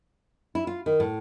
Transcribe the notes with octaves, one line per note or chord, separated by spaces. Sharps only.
E4
F4
D#3
A2